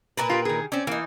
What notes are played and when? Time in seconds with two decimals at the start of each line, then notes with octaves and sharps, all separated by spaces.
0.17 A#2 A#4 B4
0.30 F4 G4
0.45 D#3 G#4
0.72 C4 C#4 D5
0.87 E3 A#3 D#4